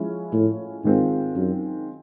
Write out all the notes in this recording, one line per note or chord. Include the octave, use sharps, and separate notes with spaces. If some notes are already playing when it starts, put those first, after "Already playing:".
Already playing: F3 G#3 C#4 E4
A2
G#2 D#3 G#3 C4 F4
F#2